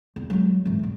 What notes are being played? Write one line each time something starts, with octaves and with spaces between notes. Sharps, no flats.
E2
F#3 G#3
G#2 E3
E2 A#2